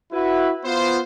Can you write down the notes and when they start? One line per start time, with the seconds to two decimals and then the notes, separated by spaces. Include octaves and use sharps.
0.12 E4 F#4 B4
0.65 B3 F4 C5